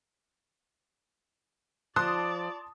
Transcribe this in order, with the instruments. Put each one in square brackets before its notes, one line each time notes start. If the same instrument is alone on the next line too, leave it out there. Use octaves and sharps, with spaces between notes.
[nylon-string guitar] F3 [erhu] D5 [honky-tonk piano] A5 C6 D#6 [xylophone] F#6